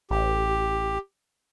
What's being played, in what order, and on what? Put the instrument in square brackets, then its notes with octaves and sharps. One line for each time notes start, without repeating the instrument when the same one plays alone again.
[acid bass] A1 [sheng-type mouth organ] G4